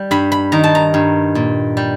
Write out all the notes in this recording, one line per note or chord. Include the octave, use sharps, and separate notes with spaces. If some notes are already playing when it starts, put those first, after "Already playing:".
Already playing: G3
G2 B5
B5
D#3 A#5
A5
A#5
G2
A#2
G3